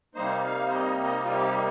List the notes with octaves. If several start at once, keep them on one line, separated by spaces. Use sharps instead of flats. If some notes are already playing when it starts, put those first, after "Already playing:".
C3 G3 A#3 D#4 C5
F5
C5
D#5
D#5
F4
G4